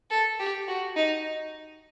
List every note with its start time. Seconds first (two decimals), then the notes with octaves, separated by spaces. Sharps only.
0.10 A4
0.40 G4
0.68 F#4
0.96 D#4